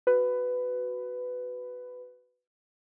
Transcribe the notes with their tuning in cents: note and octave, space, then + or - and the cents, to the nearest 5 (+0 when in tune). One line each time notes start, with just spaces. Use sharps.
F#4 +0 B4 +10